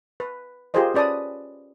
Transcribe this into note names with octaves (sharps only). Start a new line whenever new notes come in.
B4
F4 G4 G#4 A#4 C5 D#5
C#4 B4 D5 A5 D#6